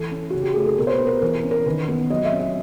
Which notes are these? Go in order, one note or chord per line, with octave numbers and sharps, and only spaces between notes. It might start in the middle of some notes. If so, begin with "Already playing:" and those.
Already playing: E3 A4
C#4
C#3 F#4
G4
A3 G#4
A4
B2 A#4
C5
B4
B3
A#4
E3 A#4
C#4
A#4
D#3 B4
B3
F#3 D#5
E5
C#4
E5